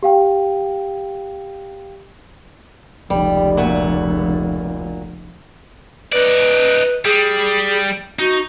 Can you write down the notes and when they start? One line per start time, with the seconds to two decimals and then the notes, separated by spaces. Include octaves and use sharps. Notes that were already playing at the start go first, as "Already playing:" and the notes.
0.03 G4 F5 G5
3.10 F1 C#2 G3
3.57 A#2 F#4 E5
6.12 D#4 B4 D5
7.05 G3 G#4
8.19 D#4 F#4